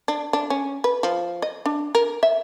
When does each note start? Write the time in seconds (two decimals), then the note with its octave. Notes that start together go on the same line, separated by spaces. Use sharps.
0.08 D4
0.33 D4
0.50 C#4
0.84 B4
1.03 F3
1.42 D#5
1.66 D4
1.95 A#4
2.23 E5